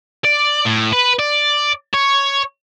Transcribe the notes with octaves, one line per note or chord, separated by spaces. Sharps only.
D5
A2
B4
D5
C#5